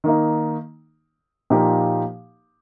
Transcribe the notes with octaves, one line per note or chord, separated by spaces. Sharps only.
D#3 A#3 D#4
A#2 F3 A#3 D#4 G4